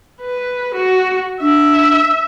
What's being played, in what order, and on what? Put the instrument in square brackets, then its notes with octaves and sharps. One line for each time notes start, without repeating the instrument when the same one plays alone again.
[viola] B4
F#4
[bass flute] D4 [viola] E5